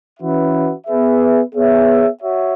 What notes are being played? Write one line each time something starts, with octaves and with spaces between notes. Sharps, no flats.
E3 C#4 F#4 B4 E5
B3 G#4 B4 E5
B3 G#4 C#5 E5
F#4 C#5 E5